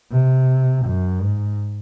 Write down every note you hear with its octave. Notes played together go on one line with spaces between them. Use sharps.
C3
F#2
G#2